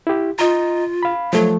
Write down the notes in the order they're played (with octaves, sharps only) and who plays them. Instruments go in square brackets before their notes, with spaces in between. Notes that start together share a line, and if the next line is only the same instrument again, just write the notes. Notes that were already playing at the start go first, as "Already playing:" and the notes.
[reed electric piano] E4 G4
[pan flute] F4 [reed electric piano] D#5 A#5
[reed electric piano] F5 B5
[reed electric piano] F3 A3 [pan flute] F#3